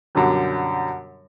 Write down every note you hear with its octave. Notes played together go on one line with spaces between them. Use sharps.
F#2 B2 D3 F#3 G3